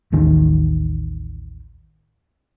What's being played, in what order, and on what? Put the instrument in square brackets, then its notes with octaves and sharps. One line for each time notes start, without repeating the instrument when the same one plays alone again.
[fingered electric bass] A1 D#2 D#3